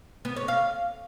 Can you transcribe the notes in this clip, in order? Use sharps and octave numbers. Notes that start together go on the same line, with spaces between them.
B3
C#5
F5